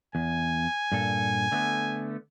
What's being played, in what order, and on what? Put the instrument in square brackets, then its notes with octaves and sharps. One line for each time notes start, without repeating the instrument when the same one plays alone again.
[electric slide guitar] E2 [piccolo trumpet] G#5
[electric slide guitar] G2 A#2 A4
D3 A3 B3